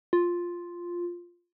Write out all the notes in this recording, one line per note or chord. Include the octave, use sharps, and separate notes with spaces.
F4